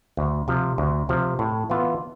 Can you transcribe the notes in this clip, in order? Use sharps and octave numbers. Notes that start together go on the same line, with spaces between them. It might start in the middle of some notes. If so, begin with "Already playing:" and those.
D2
C3 F3
D2
C3 F3
A2
E3 B3 F4